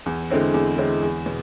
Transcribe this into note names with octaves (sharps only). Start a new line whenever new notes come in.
E2
D3 G#3 C4 E4
E2
D3 G#3 C4 E4
E2
B2